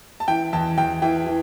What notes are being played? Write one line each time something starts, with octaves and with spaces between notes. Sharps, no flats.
A5
E3 G5
E2 A5
E2 G5
E3 G5
E3